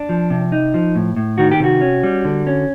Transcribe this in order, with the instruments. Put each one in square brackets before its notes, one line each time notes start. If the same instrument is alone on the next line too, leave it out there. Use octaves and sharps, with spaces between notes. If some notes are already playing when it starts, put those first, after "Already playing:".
Already playing: [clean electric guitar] D4
F3
C3
D#4
F3
A2
A2
D#3 F#4
G4
C3 F#4
C#4
G3
D3
C#4